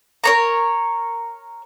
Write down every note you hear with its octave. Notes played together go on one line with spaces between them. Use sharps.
A#4 C#5 A#5